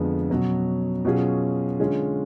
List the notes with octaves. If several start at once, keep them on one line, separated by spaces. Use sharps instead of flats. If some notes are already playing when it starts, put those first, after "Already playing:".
Already playing: F2 D3 F3 G#3 B3
B2 F#3 C#4
B2 F#3 C#4 F4 G#4
D3 G#3 C#4 F4